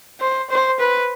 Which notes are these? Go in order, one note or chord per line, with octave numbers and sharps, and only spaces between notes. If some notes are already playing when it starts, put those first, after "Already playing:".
C5
C5
B4